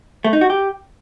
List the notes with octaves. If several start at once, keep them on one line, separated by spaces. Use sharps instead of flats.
A3
D#4
F#4
G4